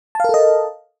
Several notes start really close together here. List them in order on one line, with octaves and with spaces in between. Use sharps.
A5 F5 A#4 A4 D#5